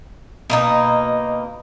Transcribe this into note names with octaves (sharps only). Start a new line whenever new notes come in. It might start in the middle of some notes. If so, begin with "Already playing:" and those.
B2 A#3 D#4